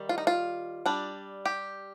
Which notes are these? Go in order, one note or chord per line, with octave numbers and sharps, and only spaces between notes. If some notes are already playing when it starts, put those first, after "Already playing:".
Already playing: D#3 G3
F4
D#4
F4
G3 D4
G4